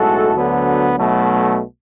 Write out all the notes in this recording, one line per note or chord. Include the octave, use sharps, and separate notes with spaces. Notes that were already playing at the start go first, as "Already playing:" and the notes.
Already playing: B1 A2 G#3 F#4 A4
D2 D3 F#3 B3
B1 B2 F#3 A3